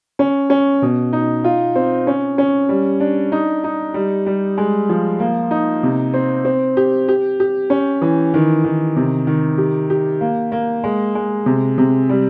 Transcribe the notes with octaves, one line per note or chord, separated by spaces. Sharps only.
C#4
C#4
B2
D#4
F4
C4
C#4
C#4
G3
D4
D#4
D#4
G3
G3
G#3
F3
A#3
D#4
C3
C4
C4
G4
G4
G4
C#4
E3
D#3
D#3
C3
D#3
G4
G4
A#3
A#3
G#3
G#3
C3
C3
G3